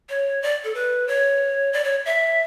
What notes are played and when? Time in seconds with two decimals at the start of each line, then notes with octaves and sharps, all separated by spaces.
0.09 C#5
0.42 D5
0.64 A4
0.74 B4
1.08 C#5
1.73 D5
1.84 C#5
2.06 E5